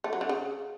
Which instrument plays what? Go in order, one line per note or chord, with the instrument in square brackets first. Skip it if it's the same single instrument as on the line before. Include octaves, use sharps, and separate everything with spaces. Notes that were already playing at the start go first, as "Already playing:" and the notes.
[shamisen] A3
F#3
D3
C#3